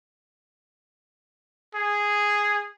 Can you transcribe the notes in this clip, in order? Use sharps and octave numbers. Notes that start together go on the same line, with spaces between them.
G#4